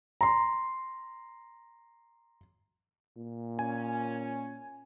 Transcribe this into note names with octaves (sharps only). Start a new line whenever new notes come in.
A#5 C6
A#2
C#4 G#5